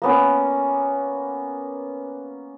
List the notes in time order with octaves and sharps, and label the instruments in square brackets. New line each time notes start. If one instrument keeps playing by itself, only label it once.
[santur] A#3 B3 C#4